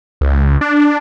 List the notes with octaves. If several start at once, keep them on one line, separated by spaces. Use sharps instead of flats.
C#2
D4